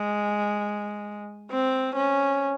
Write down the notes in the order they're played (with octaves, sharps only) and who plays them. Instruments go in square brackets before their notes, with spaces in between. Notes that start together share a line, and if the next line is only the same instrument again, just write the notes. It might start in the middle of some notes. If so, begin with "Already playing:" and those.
Already playing: [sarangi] G#3
C4
C#4